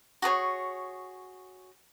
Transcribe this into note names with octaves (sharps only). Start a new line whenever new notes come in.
F#4 G#4 B4 C#5